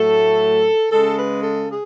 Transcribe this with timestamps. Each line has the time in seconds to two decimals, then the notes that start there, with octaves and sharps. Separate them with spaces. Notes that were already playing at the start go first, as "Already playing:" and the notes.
Already playing: A2 F#3 A3 A4
0.91 C#3 G#3 A4
1.17 B4
1.43 A4
1.70 G#4